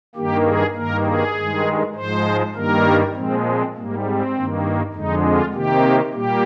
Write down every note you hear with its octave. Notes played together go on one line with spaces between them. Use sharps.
G2 D#3 A#3 G4
G#4
G2 D#3 A#3 A#4
G#4
G2 D#3 G#3
G#2 F3 G#3 C5
G2 D#3 G3 A#3 A#4
A#2 F3 G#3 C4
C4
G#2 G3 A#3
C4
G2 D#3 A#3
F2 D3 G#3 D#4
F4
C3 D#3 A#3 G4
A#2 G3 A#3 G4